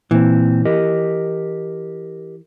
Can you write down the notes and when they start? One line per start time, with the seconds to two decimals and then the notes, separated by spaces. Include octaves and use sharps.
0.11 A#2 E3 C4
0.65 G4 A#4 D#5